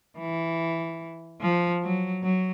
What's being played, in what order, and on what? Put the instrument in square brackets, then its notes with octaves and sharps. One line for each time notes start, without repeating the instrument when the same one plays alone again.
[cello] E3
F3
F#3
F#3